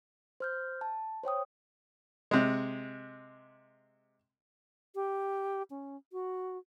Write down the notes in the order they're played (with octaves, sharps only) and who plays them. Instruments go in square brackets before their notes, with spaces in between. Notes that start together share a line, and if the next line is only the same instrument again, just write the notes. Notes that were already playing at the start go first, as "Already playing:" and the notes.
[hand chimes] C5 F6 G6
A5
C5 C#5 G5 D#6
[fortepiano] C3 G#3
[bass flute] G4
C#4
F#4